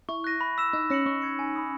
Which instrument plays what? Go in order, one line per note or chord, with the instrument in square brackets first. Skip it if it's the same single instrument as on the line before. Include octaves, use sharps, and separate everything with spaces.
[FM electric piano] E4 [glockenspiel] C#6
[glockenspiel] F#6 A#6 D#7
B5
E6 B6 E7
[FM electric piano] D#4 [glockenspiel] E6
[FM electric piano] C#4 [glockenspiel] A#6 C#7 F#7
[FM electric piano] C#4 [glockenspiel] C#6
[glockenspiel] G#6 C#7
G#5
B5 D#6